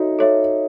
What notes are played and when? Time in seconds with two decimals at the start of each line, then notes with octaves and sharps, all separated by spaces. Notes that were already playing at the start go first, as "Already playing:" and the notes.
Already playing: D#4 F#4 A4 C#5 E5
0.19 A4 C#5 E5